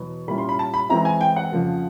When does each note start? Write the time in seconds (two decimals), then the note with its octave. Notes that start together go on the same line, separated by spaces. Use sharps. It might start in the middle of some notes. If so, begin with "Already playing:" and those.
Already playing: E2 B2 F#3 B3
0.28 A#2 G3 A#3 C#4 E4 B5
0.38 C6
0.49 B5
0.59 A5
0.74 B5
0.89 E3 G#3 C4 E4 A#5
1.05 G#5
1.21 G5
1.36 F#5
1.52 F2 C#3 F3 A#3